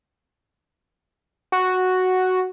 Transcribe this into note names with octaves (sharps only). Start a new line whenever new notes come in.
F#4